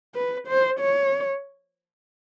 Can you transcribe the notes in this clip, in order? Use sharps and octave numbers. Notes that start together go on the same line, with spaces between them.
B4
C5
C#5